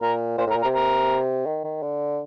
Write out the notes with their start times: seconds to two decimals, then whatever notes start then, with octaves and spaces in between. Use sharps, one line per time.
0.01 A#2 A#4
0.38 A#2 C5
0.47 A2 A#4
0.56 A#2
0.62 A#4
0.65 C3
0.74 A#4
1.46 D#3
1.64 D#3
1.83 D3